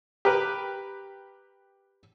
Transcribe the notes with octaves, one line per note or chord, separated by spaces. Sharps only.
G4 A#4 B4